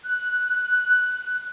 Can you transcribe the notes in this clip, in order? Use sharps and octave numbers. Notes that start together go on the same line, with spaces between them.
F#6